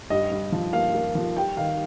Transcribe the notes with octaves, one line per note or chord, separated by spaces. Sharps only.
G2 D#5
G2
F3
A#3 F5
A#3
F3
G3 G5
D#3 F5